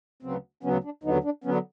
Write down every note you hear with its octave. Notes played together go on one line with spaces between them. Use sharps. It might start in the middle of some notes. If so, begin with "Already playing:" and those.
D2 C#3 F#3 B3 C4
D2 C#3 F#3 B3 C#4
D4
D#2 D3 F#3 B3 D#4
D4
D3 F#3 B3 C#4